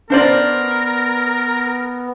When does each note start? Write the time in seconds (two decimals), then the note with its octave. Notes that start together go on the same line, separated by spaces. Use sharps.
0.10 B3 D4 A#4 C5 D5